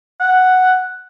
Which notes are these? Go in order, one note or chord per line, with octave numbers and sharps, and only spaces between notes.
F#5